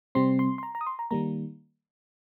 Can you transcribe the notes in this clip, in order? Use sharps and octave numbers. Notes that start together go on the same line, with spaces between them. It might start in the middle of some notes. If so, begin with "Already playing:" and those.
C3 G3 C4 C6
C6
C6
A#5
A#5
D#6
C6
A#5
D#3 G3 A#3 A#5